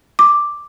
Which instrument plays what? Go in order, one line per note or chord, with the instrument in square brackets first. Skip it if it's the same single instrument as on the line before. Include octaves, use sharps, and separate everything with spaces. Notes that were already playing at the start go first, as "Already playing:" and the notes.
[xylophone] D6